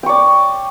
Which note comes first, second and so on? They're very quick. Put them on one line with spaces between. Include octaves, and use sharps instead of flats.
G5 C#6 D5